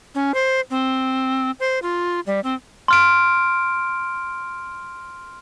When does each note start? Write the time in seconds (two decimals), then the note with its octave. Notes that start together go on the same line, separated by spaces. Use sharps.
0.15 C#4
0.34 C5
0.70 C4
1.60 C5
1.82 F4
2.26 G3
2.44 C4
2.88 C6 F6 D7